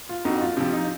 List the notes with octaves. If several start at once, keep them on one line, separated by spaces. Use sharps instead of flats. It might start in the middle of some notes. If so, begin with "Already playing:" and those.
F4
F2 D#4 F#4
F4
C3 F3 F4
D#4